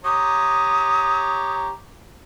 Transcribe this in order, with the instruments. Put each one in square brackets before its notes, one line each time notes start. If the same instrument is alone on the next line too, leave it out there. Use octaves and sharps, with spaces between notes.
[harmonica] G4 C#5 A#5 [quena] D#6